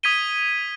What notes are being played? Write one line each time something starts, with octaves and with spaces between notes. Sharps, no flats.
D#6 G#6 B6 D#7 G7